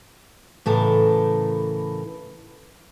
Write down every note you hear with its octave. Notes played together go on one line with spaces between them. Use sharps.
A2 C#3 E3 A4 A#4 A5